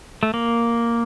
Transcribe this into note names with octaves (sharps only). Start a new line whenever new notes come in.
A3
A#3